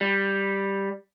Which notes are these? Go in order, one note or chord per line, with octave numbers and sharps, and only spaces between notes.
G3